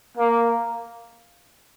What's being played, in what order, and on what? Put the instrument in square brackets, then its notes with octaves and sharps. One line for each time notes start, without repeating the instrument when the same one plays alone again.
[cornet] A#3